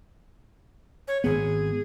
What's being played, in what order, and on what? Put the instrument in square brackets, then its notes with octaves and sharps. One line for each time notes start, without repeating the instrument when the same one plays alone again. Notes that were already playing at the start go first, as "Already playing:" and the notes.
[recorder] C#5
[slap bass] G#1 B3 [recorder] G#4